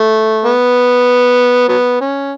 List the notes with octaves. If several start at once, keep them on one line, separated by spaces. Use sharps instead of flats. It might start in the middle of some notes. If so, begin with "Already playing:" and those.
Already playing: A3
B3
F#3 B3
C#4